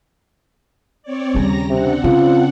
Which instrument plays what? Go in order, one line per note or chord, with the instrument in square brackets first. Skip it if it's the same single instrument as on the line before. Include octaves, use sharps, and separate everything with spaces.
[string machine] C4 C#5 D5
[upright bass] D#2 C#3 [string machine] G3 A#5 A#6
[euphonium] C3 [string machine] C4 D4 F#5
[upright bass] C#3 [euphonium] F4